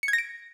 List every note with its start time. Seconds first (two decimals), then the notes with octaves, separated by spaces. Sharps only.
0.03 C#7
0.08 G#6
0.13 A#6
0.18 D7